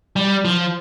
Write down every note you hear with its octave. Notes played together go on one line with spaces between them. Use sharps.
G3
F3